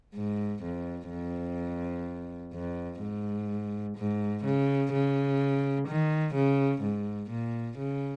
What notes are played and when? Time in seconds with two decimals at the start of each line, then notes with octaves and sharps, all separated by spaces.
0.15 G#2
0.63 F2
1.10 F2
2.53 F2
3.01 G#2
3.97 G#2
4.44 C#3
4.92 C#3
5.88 D#3
6.34 C#3
6.82 G#2
7.30 A#2
7.78 C#3